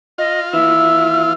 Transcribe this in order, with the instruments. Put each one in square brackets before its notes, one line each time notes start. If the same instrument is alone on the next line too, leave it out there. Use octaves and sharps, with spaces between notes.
[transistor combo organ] F4 [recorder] D#5
[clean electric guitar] D#2 E3 [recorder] E5 [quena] E6